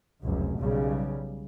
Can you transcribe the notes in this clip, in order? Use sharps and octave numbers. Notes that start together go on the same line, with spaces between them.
F1 C#2 F#2
B1 C#3 G3